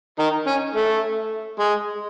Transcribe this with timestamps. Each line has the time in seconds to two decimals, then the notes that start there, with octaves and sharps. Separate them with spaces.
0.19 D#3 D#4
0.47 C#4
0.75 A3
1.60 G#3